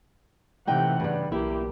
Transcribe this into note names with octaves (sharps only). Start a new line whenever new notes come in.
C3 E3 A3 D#4 F#5 G5
G2 C#3 G3
B1 A#3 E4 G4